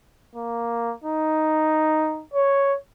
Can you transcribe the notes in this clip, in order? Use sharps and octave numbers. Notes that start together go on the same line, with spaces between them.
A#3
D#4
C#5